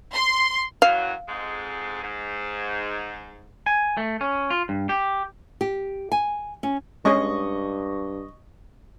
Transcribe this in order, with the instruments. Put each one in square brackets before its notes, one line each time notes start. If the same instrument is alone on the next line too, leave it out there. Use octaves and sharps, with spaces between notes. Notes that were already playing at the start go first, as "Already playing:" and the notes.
[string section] C6
[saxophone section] F#2 E3 F#3 [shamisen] F5
[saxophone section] F2 G#2 G#3
G#2
[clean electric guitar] G#5
A3
C#4
F4
G2
G4
[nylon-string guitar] G4
G#5
C#4
[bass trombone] G2 [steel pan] G#3 C#4 G#4 [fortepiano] D#5 C#6